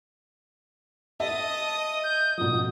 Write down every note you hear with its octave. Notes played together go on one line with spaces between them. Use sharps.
D#5 E5 A5 D#6
G6
B2 F3 D#6